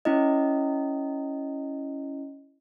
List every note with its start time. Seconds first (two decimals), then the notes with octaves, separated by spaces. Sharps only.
0.05 C#4 E4 D#5